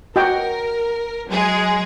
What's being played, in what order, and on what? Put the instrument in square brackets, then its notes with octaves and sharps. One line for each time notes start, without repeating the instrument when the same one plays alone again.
[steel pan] F#4 D#5 G5 [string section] A#4
[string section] F#3 G#3 G#4